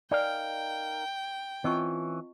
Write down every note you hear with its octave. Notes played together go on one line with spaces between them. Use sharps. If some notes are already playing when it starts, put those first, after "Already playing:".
D#4 A#4 D5 F5 G5 G#5
E3 C4 C#4 F4 D#5 A5 C#6